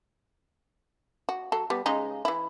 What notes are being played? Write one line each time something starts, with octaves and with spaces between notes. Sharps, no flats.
F#4
F#3 A4
G3 B3
C#3 G#3 D#4
E3 E4